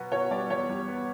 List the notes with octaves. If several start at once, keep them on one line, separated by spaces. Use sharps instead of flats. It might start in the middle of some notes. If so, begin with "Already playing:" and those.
Already playing: B2 F#3 B3
B2 C#5
G3 D5
E2 C#5
G3
B3